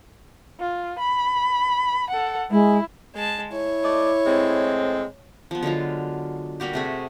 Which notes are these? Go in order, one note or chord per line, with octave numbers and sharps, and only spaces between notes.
F4
B5
A4 F#5
G#3 E4
G#3 A5
E4 C#5
A3 D5 D#5
A2 G#3 C4
F3 B3
D3 F#3 G#3 F4
G3 A#3 F#4 G4
C3 A3 G#4